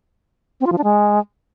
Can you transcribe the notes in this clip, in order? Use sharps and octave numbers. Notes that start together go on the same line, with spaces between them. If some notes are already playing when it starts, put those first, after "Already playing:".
C4
F4
F3
D4
G#3